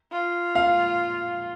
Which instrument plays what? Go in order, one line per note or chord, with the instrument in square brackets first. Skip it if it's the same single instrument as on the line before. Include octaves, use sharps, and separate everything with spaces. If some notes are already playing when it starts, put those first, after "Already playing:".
[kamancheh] F4
[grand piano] F5